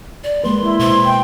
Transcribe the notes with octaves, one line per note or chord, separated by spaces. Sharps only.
D5
G#3 A#3 B4 C6
E4
B2 C5 C6
G5